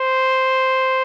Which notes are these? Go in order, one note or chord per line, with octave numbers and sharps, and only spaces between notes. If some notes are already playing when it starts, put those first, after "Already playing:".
Already playing: C5